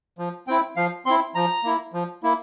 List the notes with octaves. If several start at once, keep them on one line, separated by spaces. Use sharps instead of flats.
F3
C4 E4 G5
F3 F5
C4 E4 C6
F3 A#5
A#3 E4
F3
A#3 E4